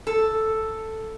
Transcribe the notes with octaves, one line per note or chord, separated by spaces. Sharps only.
A4